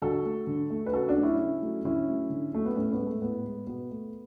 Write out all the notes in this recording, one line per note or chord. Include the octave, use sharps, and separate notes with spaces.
D3 F#4 A4
A3
D3
A3
B4
C#3 F#4 A4
D4 F#4
F#3 A3
C#4 E4
C#3
F#3 A3
D3 C#4 E4
F#3 A3
D3
F#3 A3
B3
A2 A3 C#4
B3
G#3
A3
A2 B3
G#3
B2 B3
A3